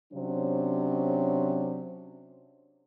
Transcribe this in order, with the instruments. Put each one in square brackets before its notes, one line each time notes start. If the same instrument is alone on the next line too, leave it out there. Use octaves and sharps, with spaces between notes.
[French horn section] C3 F#3 C#4 D4 C5